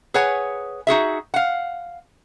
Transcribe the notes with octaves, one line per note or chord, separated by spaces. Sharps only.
G#4 B4 C#5 F#5 G#5
D#4 F#4 G#4 E5
F5 F#5